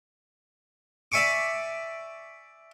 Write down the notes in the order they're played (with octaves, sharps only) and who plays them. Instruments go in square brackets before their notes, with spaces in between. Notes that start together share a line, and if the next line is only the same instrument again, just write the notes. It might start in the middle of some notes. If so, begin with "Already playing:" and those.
[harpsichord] D5 E5 G#5 C#6 D6